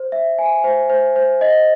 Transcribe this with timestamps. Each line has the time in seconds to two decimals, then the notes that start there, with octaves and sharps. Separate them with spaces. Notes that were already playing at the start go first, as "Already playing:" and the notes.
Already playing: C5
0.12 E5
0.38 G#5
0.64 C5
0.90 C5
1.16 C5
1.41 D#5